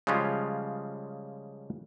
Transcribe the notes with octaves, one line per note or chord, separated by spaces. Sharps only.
C#3 F3 G3 G#3 C#4 F4